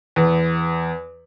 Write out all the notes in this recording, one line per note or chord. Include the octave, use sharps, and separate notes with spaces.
E2